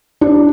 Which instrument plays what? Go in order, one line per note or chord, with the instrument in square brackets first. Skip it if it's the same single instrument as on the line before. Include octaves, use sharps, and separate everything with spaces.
[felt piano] D4